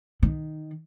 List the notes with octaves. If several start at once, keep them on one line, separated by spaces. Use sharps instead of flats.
D#3